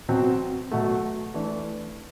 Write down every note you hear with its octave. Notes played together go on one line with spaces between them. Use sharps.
B2 F#3 C4
B2 F#3 A3
E3 A3 D4